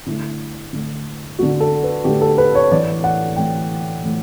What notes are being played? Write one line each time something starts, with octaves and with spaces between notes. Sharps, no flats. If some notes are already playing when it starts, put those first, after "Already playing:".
D3 A3 E4
D3 A3
D3 A3 F#4
A4
B4
D3 A3 G4
A4
B4
C#5
A2 E3 A3 D5
F#5
A2 E3 A3 G5
A2 E3 A3